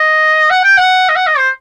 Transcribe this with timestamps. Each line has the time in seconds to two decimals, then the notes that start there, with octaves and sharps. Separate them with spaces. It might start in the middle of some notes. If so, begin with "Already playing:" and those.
Already playing: D#5
0.50 F#5
0.64 G5
0.78 F#5
1.09 D#5
1.16 F#5
1.27 D#5
1.38 C5